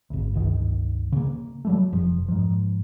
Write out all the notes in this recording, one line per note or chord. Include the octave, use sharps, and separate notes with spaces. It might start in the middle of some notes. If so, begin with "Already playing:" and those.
G#1 D2
G1 C#2 D#3
C#3 A#3
F#3 G3 A3
F1 F3
G#2 F3